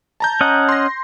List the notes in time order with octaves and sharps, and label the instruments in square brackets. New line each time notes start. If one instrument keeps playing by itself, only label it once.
[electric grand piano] A5 A#5 G6
[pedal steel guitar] C#4 D#5 F#5
[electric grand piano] C6 A#6